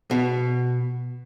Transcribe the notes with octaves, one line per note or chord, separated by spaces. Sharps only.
B2